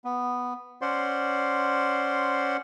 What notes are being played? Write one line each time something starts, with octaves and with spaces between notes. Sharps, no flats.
B3
C#4 C5 D5 F#5 C6